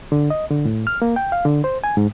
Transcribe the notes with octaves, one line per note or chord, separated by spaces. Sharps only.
D3
D#5
D3
A2
F6
A#3
G5
F5
D3
C5
G#5
G#2